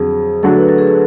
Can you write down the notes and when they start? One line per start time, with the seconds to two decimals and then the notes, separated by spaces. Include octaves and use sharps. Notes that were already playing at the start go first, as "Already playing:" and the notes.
Already playing: F2 D3 F#3 G#4
0.43 D3 F#3 A3 D4 F#4 A4
0.57 B4
0.69 A4
0.78 G#4
0.87 A4